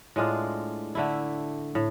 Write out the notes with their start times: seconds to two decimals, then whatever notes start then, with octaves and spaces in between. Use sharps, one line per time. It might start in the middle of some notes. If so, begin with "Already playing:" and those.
0.16 A2 G#3 D4 F4
0.95 D3 A3 E4
1.75 A2